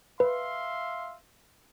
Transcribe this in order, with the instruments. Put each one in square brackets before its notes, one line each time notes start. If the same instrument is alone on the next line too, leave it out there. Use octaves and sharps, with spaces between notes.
[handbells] B4 [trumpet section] E5 F5 C6